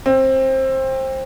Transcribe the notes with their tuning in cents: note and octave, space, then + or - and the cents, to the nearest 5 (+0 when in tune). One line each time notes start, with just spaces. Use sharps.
C4 +20